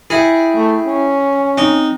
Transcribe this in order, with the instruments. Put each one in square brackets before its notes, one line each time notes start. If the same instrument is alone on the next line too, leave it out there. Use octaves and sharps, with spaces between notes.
[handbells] E4 E5 G5 [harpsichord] G#4
[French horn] A3
C#4
[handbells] C4 [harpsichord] D#4